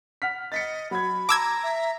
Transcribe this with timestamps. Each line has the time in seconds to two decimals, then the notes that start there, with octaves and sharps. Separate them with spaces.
0.22 F#5 F6 B6
0.52 D#5 A6 B6 C#7
0.91 F#3 B5 G#6
1.29 A5 A#5 D6 E6 G#6
1.63 E5